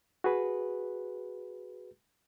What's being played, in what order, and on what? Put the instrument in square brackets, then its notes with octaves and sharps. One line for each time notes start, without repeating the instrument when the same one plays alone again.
[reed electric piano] F#4 G#4 B4